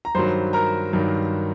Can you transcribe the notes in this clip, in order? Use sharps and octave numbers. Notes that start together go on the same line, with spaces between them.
A#5
G2 D#3 F#3 C5 C6
A#4 A#5
G2 D#3 F#3